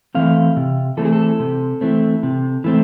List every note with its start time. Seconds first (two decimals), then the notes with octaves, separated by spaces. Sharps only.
0.15 E3 A3 C4 F5
0.57 C3
0.97 E3 A3 C4 A4
1.05 G#4
1.12 A4
1.39 C3
1.81 E3 A3 C4
2.23 C3
2.64 E3 A3 C4